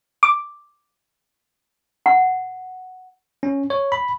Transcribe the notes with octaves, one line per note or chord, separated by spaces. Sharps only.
D6
F#5
C#4
C#5
B5